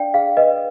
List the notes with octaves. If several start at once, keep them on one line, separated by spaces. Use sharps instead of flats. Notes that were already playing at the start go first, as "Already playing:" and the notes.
Already playing: D4 D5 F5 G5
G#4 F5
B4 D#5